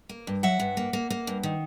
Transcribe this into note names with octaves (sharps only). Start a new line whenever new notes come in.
A#3
G2
F#3 E5 F#5
G2
A#3
A#3
A#3
G2
D#3